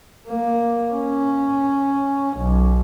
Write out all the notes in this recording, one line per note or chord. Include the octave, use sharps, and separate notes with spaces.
A#3
C#4
B1